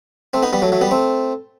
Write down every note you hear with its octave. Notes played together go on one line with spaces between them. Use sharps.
A3 C4
B3 D#4
G3 B3
F#3 A3
F#3 A3
G3 B3
A3 C4